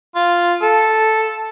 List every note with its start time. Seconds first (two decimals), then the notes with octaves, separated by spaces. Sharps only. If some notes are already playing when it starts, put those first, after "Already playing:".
0.15 F4
0.62 A4